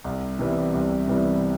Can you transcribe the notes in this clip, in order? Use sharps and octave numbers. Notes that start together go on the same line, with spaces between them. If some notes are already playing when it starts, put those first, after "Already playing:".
C2
C3 E3 G3 B3
C2
C3 E3 G3 B3